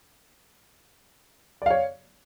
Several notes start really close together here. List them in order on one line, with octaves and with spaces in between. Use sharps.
D5 F5 C#5